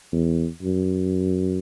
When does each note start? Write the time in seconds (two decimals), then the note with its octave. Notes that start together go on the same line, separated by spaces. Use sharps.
0.12 E2
0.62 F#2